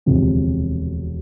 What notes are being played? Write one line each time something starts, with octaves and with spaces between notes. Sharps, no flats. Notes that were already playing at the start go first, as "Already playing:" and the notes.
E1 D2 C3 F3 C4